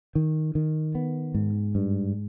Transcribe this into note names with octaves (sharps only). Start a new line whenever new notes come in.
D#3
D#3
B3
G#2
G2